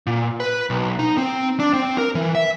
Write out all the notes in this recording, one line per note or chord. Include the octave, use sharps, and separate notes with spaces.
A#2
B4
B1
D#4
C4
D4
C4
A#4
E3
E5